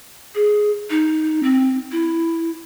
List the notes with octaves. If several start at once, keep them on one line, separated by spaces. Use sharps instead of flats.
G#4
D#4
C4
E4